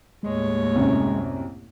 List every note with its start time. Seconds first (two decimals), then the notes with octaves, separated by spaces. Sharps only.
0.23 D#2 A2 G#3 C#5
0.75 C2 F#2